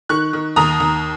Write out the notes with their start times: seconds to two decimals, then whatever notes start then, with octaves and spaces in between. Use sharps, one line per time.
0.09 D#3 C#6 F#6
0.33 D#3
0.56 D#2 A#5 D#6
0.80 D#2